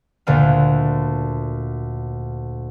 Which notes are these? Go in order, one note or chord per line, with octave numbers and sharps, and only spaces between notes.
D2 A#2 D3 F5